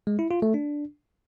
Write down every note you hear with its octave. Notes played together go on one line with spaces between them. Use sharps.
G#3
E4
F4
A3
D4